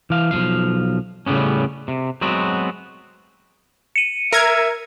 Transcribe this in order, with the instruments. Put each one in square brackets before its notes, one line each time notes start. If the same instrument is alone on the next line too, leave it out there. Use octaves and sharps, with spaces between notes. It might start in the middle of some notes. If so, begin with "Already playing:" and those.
[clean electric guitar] E3 F5
B1 A#2 F3 F5
A2 C#3 G3 B3 C#4
C3
F#3 G#3 B3 C4 F#4
[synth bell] C#7 D#7
[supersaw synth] A#4 G#6 [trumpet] E5